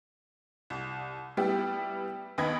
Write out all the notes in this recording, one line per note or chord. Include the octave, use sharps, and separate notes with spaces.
C2
G3 B3 E4 G4
D#2 B3 D#5 B5 G#6